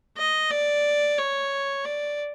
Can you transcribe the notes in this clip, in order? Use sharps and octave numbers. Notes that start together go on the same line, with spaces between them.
D#5
D5
C#5
D5